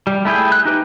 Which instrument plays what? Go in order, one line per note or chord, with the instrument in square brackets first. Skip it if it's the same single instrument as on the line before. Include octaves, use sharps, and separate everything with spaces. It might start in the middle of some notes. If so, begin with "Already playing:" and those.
[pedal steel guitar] G3
A3 E4 G#4 G5
F#6
D#4 G4 B4